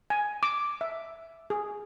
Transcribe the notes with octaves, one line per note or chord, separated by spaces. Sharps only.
G#5
D6
E5
G#4